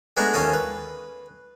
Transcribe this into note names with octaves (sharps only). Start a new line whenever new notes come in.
G#3 A3 B3 D4 G#4 A#5
D#2 C#4 F4 A4 D#6
B4